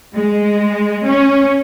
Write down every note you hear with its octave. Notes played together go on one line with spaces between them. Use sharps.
G#3
C#4